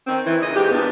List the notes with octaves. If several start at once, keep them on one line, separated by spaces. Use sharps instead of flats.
D#3 C4
E3
A#2 C#3 D#4 D#5
G#2 G4
E2 A#2 B3 D4